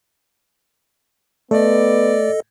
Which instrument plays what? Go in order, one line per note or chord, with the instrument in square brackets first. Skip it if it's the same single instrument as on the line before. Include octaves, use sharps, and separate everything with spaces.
[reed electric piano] A3 [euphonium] B3 [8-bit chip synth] A4 D#5 [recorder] D5